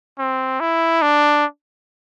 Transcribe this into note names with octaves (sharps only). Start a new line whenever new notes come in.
C4
E4
D4